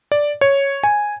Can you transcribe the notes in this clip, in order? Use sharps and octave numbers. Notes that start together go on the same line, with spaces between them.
D5
C#5
G#5